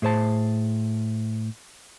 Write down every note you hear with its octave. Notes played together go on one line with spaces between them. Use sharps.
A2 G#4 C5 A5